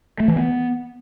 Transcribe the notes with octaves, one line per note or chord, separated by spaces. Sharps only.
A3
E3
B3